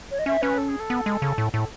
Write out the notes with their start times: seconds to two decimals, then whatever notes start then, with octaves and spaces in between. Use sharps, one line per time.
0.11 C#5
0.19 D#5
0.26 C#4 E5
0.42 C#4 B4
0.58 A4
0.68 G#4
0.80 A4
0.90 B3
1.06 G#3
1.22 C#3
1.38 A2
1.53 A2 A4